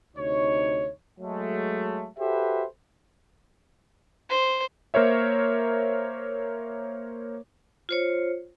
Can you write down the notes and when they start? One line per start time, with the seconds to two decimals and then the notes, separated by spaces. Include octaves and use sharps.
0.16 D2 C3 D#4 C#5
1.20 F#3 G#3 A3
2.19 F#4 G4 A4 B4 C5 E5
4.29 C5
4.94 A#3 A#4 C5 C#5 E5
7.89 F4 C5 C#5